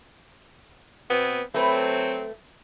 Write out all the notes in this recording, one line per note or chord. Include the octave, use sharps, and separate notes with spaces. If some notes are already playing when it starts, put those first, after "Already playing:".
B2 B3 C4
F#3 A3 C4 B4